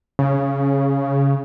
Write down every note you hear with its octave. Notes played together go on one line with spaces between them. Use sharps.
C#3